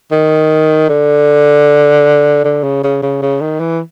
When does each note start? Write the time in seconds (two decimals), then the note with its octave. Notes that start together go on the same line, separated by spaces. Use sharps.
0.12 D#3
0.89 D3
2.44 D3
2.63 C#3
2.84 C#3
3.02 C#3
3.22 C#3
3.41 D#3
3.60 E3